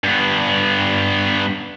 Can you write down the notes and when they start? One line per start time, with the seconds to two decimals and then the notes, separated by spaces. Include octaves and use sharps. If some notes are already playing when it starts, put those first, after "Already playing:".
0.04 G2 B3